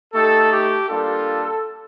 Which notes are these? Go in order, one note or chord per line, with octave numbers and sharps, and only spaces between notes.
A3 D#4 G4 A4
G4
G3 A#3 D4 F4 A4